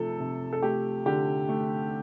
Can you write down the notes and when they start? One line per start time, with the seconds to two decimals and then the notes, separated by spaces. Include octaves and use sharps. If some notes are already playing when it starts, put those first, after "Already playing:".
Already playing: C3 F3 A3 A4
0.20 C3
0.53 A4
0.62 A3 G4
1.06 D3 G4
1.49 A3